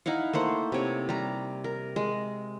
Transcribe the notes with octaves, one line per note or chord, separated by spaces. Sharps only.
D#4 E4 F5 F#5
A3 A#3 C5 F#5
C3 C#5
G3 A#5
A#4
G#3